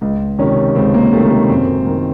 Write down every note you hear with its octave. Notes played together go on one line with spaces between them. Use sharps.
C#2
C3 D#3 C#4
C#2 C4
A#3
C3 D#3 A3
A3
F#2 C4
D#3